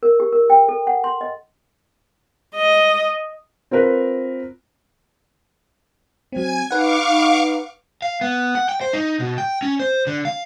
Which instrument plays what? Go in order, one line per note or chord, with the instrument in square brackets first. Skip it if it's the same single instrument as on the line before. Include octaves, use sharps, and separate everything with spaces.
[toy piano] A#4
G4
A#4
G5
A4
F#5
C6
D#5
[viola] D#5
[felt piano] C4 F4 A#4 B4
[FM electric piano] F#3 C4 [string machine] G#5 G#6
[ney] D#4 [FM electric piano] B4 F#5 [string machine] F5 C#6 D6
[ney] D#4
[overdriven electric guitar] F5
B3
F#5
G5
C5
D#4
B2
G5
C#4
C5
D3
F5